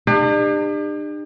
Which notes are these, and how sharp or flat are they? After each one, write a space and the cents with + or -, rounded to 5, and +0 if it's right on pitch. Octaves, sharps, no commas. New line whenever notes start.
D4 +45 G4 +40